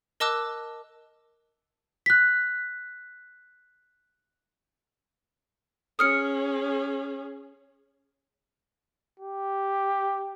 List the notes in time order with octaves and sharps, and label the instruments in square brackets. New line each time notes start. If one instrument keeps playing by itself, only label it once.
[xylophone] A#4 D#5 A5 D6 E6 F#6
[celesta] F#6 B6
[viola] C#4 G#4 [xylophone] D#6 F6 C#7
[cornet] G4